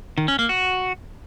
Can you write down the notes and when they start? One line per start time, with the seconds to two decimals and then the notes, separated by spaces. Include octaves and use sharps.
0.18 D#3
0.28 C#4
0.39 A#3
0.49 F#4